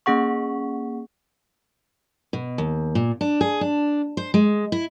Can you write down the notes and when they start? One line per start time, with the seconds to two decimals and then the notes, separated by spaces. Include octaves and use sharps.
0.06 A#3 C#4 G#4 F#5 C#6
2.33 B2
2.58 D#2
2.95 A#2
3.21 D4
3.41 G#4
3.61 D4
4.17 C5
4.34 G#3
4.72 E4